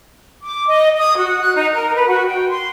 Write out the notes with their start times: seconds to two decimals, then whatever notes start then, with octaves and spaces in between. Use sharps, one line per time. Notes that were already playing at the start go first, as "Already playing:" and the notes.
0.42 D6
0.68 D#5
0.97 D#6
1.17 F#4
1.40 F#6
1.54 D#4
1.73 A#4
1.94 B4
2.08 F#4
2.26 G5
2.49 C6